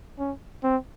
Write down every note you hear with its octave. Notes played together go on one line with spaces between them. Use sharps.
C#4
C4